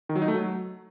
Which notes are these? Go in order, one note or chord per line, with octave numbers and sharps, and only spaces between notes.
D#3
F#3
D#4
A3
F#3